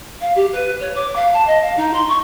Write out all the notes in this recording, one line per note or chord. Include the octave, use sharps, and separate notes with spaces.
F5
G4
B4
C#5
D6
F5
A5
D#5
F5
D#4
C6
C#6